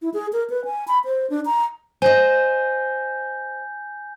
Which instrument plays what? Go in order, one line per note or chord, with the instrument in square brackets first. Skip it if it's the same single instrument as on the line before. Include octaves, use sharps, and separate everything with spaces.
[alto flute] E4
G#4
A#4
B4
G#5
B5
C5
D4
A#5
[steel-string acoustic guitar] C5 D#5 [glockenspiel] G#5 G6